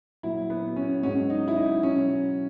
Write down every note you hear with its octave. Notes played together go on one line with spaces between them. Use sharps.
A#2 F#3 E4
B3
C#4
G#2 F#3 C#4
D#4
E4
D#4
B2 F#3 C#4